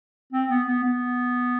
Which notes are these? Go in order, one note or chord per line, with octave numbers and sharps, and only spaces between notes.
C4
B3
B3
B3